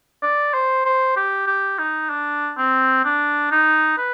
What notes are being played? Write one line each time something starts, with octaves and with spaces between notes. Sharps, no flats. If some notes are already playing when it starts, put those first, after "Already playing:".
D5
C5
C5
G4
G4
D#4
D4
C4
D4
D#4
B4